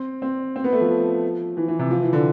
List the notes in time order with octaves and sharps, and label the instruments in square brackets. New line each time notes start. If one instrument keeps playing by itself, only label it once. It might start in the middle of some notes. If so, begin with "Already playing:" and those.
Already playing: [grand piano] C4
C4
C4
B3
A3
F3
E3
E3
C3
F3
E3
D3